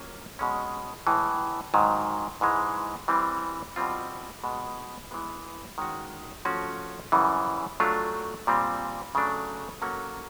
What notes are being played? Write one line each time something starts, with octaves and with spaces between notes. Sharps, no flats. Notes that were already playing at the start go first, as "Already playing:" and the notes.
Already playing: F#3 A#3 C#4 F4
B2 G#3 C#4
A2 E3 G#3
G#2 D#3 F#3
G#2 E3 G#3
E3 G3 C4
B2 G3 C4 F4
B2 G#3 B3
E3 G#3 B3
D#3 G#3 C#4 F#4
F3 A3 C#4 F#4
F#2 C#3 E3 G3
F#3 A3 D4 F4
A#2 G3 C4
C#3 F#3 A3 D4
F#3 A#3 C#4 F#4 A4